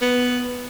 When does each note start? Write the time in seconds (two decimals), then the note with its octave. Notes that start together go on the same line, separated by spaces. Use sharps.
0.02 B3